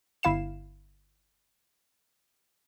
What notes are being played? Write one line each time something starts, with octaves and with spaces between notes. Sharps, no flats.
G1 E4 F5 C7 E7